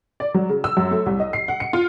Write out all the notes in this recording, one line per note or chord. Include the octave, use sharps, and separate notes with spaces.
D5
F#3
C#3
E6
F#2
A3
C2
D#5
C7
F#5
C#7
F4